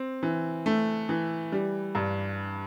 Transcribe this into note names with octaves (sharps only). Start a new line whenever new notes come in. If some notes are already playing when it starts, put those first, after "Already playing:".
Already playing: C4
E3
A3
E3
G3
G2